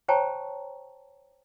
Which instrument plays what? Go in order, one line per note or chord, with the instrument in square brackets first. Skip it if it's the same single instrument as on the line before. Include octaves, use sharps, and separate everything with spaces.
[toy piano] C5 C#5 G5 A5 A#5 C#6